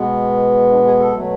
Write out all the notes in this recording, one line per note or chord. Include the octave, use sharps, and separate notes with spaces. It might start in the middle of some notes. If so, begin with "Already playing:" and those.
Already playing: B2 G#3 B3
D4
G#4
A4
B2 F#3 A3